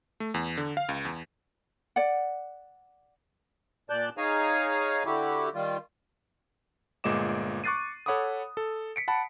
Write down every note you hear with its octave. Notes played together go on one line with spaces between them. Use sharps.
A3
E2
D3
F5
C#2
E2
D5 F#5
A#2 D5 A5 F#6 G6
D#4 G#4 C#5 F5 G#5 A#5
D3 E4 F#4 G4
D#3 G3 F4
G1 A#2 G#3 D#5 D6 E7
C#6 D6 F#6 A6 C7 D#7
A4 C#5 F#5 B5 D6 D#6
A4
B6 C#7 D7
F#5 A5 B5